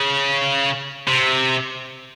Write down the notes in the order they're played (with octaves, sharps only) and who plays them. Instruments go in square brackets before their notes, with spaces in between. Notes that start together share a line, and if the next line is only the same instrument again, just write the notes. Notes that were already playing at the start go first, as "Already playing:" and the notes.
Already playing: [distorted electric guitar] C#3
C3